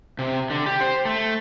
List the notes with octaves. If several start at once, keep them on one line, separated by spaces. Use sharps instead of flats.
C3
D3
G4
C5
A3